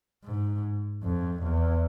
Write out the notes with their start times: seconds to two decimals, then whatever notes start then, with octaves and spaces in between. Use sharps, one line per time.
0.25 G#2
1.03 F2
1.43 E2